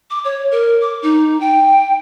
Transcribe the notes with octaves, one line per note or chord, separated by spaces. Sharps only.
D6
C#5
A#4
D6
D#4
G5